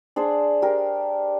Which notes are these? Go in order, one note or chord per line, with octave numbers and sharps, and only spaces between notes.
D4 G#4 C5 D5
G4 A#4